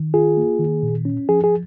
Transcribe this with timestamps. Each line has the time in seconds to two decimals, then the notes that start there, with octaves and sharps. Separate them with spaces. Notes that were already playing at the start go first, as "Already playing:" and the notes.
Already playing: D#3
0.14 F4 G#4
0.37 A#3
0.59 D#3
0.83 A#2
1.05 C#4
1.28 F3 G#4
1.44 G#4